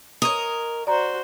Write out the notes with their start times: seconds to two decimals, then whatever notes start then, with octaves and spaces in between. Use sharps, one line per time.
0.22 A#4 C#5 D#5 D#6
0.87 F#4 C5 D5 A#5